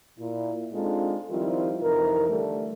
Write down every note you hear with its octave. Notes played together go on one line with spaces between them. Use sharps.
A#2 E4
G#3 C4 D4 D#4 F4 A4
D#3 F3 G3 C4 E4 F4
F2 C3 E3 D#4 A#4
D3 E3 G3 A3